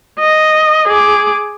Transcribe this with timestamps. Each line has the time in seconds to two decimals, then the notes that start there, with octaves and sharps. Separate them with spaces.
0.19 D#5
0.88 G#4 D6